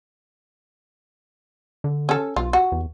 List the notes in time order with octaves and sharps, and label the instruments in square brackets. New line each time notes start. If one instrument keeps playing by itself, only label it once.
[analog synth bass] D3
[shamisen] C#4 A4
[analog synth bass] B1 [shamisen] F4
[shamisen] F#4
[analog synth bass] E2